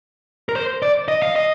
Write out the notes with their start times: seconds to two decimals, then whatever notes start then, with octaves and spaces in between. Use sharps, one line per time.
0.49 A#4
0.56 C5
0.82 D5
1.08 D#5
1.22 F5
1.36 D#5